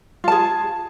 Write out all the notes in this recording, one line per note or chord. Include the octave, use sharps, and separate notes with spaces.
F4 G#4 A5